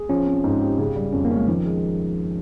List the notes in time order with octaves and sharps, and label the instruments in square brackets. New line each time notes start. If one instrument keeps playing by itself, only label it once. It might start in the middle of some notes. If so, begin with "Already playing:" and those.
Already playing: [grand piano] G#4
[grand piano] F3 [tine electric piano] C#4
[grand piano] C4
G#2
G4
C#3
G3
[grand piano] F2 [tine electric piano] C#4
[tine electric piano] A#3
[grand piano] C#4
[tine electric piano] G#3
[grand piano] D#3 [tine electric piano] F3
[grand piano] G#3